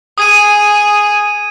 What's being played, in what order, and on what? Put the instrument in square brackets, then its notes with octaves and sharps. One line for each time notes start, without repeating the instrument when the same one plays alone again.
[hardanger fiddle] G#4 [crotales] D#6 G#6 D#7